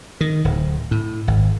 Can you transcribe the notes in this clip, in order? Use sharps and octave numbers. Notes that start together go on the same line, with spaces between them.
D#3
D1
A2
G#1